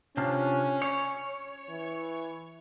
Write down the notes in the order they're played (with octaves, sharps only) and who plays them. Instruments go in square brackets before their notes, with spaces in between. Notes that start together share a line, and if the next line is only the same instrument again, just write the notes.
[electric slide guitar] C3 D4 F4 [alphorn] C#4
[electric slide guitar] C#5
[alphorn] E3